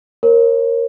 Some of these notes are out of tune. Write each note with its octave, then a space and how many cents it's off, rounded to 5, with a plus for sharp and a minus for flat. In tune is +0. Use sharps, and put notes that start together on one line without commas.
A#4 +0 C#5 -30